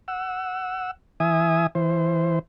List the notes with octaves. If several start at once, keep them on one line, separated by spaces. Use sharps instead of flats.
F#5 E6
E3 E5 G#5 D#6
E3 C5